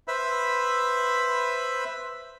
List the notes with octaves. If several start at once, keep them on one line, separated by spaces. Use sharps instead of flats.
B4 C5 E5 B5 E6